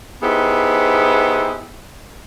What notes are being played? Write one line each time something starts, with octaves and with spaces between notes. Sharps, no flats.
B3 D#4 E4 G4 G#4 C5